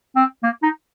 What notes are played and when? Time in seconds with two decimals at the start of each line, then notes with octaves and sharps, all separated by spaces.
0.16 C4
0.43 A#3
0.63 D#4